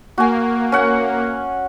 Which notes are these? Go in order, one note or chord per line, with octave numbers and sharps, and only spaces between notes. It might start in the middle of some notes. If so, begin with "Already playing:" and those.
A#3 F#4 G#5
C#4 F#5